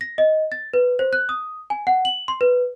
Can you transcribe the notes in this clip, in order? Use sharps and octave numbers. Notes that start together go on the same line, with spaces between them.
A#6
D#5
A6
B4
C5
F#6
D#6
G#5
F#5
F#7
C6
B4